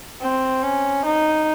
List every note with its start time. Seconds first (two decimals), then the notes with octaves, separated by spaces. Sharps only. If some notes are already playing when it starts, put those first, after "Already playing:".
0.21 C4
0.63 C#4
1.05 D#4